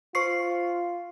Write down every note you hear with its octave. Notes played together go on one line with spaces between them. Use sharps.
F4 C5 C#6 C7